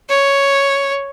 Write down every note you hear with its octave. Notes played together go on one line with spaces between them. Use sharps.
C#5